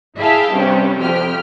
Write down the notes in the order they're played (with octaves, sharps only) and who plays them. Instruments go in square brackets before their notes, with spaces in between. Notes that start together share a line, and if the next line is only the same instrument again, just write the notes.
[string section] E4 G#4 E5 F5 G5 A5
G2 C3 G3 C#4
F2 G4 G5 F6